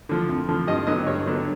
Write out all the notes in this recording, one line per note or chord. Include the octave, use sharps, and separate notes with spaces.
D3 F3
F2
D3 F3
G2 D#5
D3 F#3 B3 D4 D#5
G2 C#5
D3 F#3 B3 D4